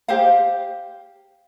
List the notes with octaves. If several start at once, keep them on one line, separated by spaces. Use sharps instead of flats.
G4 C5 F5